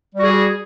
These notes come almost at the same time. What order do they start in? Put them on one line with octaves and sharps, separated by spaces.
G3 F#4 G#4